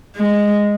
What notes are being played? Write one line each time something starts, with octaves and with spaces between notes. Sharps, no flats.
G#3